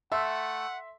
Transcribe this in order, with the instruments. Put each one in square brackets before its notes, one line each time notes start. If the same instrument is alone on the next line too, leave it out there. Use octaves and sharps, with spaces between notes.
[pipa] A3 [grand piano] E5 C6 [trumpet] F#5